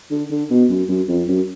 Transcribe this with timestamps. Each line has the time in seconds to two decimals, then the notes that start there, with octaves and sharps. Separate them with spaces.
0.11 D3
0.31 D3
0.51 B2
0.70 F#2
0.89 F#2
1.08 F2
1.28 F#2